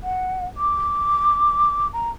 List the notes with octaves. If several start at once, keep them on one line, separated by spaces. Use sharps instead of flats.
F#5
D6
A#5